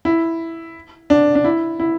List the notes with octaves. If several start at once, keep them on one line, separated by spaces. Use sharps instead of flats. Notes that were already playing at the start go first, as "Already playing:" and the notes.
E4
D4
D4
E4
E4